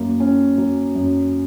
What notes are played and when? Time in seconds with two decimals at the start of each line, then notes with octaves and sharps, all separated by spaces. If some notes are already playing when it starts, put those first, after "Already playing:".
Already playing: F#2 A#3
0.20 C#4
0.58 F#3
0.95 F#2